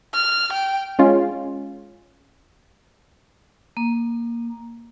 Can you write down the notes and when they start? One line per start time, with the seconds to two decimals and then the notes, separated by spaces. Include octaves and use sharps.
0.15 F6
0.53 G5
0.99 G#3 C#4 F4
3.77 A#3